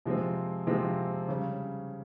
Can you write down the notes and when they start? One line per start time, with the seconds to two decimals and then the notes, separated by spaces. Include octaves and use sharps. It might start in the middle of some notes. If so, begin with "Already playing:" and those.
0.06 C3 F3 G#3 C4
0.67 C3 F3 G#3 C4
1.28 C#3 G3 C#4